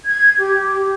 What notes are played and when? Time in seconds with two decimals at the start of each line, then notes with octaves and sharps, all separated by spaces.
0.05 G#6
0.39 G4